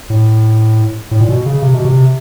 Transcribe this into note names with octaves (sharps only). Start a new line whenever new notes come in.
A2
A2
A#2
B2
C#3
C3
B2
C3